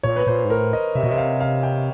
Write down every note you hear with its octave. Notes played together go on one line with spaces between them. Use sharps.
A#2 C#5
B4
A#2 C5
G#2
A2 A#4
D#5
C3 E5
B2 D#5
C3 E5
F5
F5
G5